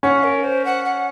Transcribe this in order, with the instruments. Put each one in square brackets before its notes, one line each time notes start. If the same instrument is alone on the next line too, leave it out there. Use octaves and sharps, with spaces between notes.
[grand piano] C#4 [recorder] F#5
[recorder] A#4
C5
F#5
F#5